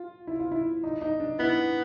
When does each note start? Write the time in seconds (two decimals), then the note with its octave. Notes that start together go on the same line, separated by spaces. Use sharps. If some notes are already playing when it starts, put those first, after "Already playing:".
Already playing: F4
0.27 E4
0.40 F4
0.52 E4
0.84 D#4
1.01 D#4
1.20 D4
1.39 B3 E4